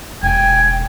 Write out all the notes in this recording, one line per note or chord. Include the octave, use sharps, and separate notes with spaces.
E1 G5 G#5